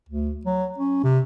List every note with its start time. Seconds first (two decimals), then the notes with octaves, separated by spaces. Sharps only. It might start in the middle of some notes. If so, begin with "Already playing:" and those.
0.09 D2
0.45 F#3
0.78 C#4
1.04 C3